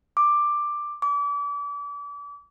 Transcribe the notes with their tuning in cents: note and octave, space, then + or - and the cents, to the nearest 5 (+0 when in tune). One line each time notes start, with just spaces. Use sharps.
D6 +10
D6 -35